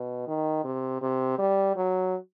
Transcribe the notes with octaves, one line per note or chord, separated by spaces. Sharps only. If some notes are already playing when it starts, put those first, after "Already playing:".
Already playing: B2
D#3
C3
C3
G3
F#3